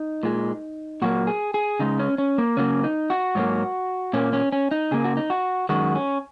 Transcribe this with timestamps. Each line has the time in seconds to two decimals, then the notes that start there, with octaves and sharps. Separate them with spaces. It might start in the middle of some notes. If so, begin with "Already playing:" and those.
Already playing: D#4
0.23 A#2 G#3
1.02 A#2 F#3 A#3 F#4
1.27 G#4
1.54 G#4
1.79 C#3 G#3 D#4
1.99 C#4
2.18 C#4
2.38 A#3
2.57 C#3 F#3 A#3 C#4
2.84 D#4
3.10 F#4
3.35 G#2 F#3 A#3
4.13 A#2 A#3 C#4
4.33 C#4
4.52 C#4
4.71 D#4
4.91 C#3 A#3 G#4
5.04 F#4
5.17 D#4
5.30 F#4
5.69 F#2 D#3 G#3 F#4
5.95 C#4